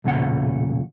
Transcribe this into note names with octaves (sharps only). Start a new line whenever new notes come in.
B1 E2 A#2 C#3 F#5